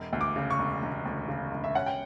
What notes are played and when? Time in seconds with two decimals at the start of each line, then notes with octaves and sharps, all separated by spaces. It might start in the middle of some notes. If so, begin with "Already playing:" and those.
Already playing: E1
0.13 D2
0.21 D6
0.36 C#3
0.50 C#6
0.59 E1
0.82 E1
1.06 D2
1.28 C#3
1.51 E1
1.64 E5
1.75 C#4 F#5
1.86 G5